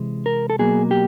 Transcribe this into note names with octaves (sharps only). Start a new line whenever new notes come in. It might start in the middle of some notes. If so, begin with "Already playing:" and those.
Already playing: C3 E3 G#3
A#4
A4
B2 F#3 A#3 G#4
G4